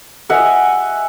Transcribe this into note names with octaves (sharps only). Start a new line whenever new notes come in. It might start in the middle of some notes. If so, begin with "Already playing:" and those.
D#5 E5 F#5 G#5